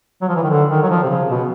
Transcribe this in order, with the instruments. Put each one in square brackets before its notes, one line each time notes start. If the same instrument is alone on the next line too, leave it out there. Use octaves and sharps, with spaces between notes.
[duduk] F#3
F3
E3
D#3
D3
D#3
F#3
F3
C3
C#3
B2